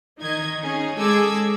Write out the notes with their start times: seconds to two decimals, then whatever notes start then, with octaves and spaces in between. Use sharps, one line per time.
0.20 D#3 D#4 D#5 G#6
0.61 C#4 D#4 G#4
0.97 G#3 G#4 A4 D6 E6 G#6